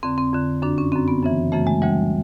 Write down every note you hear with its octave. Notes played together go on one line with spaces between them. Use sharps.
F2 D3 C4
C4
F2 D3
F#2 D3 D4
C#4
F#2 D3 C4
B3
F#2 C#3 E3
F#2 C#3 E3 A3
G#3
D2 C#3 E3 G3